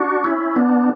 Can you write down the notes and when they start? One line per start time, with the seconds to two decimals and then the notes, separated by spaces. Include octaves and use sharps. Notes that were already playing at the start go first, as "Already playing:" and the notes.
Already playing: D4 F#4
0.24 C#4 E4
0.56 B3 D4